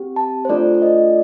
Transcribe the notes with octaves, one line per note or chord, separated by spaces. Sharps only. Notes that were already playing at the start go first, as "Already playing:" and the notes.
Already playing: C4 G4
A5
C5
A3 D4 F4 A4 D5
D5
D#5